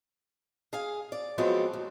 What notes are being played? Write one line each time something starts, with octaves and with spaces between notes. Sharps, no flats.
G#4 F5 G#5
D5
F3 F#3 G#3 B3 C4 F4
D#2